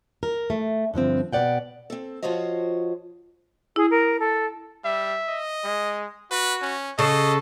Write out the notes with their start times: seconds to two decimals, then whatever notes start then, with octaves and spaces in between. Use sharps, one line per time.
0.23 A#4
0.50 A3
0.94 G2 D3 F3 C4
1.33 B2 B4 D5 F#5 G5
1.90 C4 A4
2.23 F3 F4 F#4 C5 C#5 D#5
3.76 E4 G#4
3.90 A#4
4.19 A4
4.84 G3 E5
5.28 D#5
5.64 G#3
6.31 F#4 B4
6.62 C#4
6.99 C#3 A4 D#5